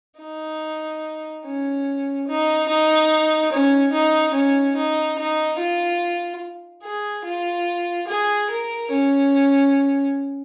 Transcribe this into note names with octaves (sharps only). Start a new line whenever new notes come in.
D#4
C#4
D#4
D#4
C#4
D#4
C#4
D#4
D#4
F4
G#4
F4
G#4
A#4
C#4